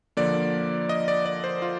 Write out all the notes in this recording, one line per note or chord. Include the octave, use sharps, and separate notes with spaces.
D3 F3 A#3 D5
D#5
D5
D5
C5
F4